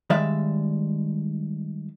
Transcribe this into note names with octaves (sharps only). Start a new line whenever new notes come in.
D#3 G3 G#3 D5 E5 F5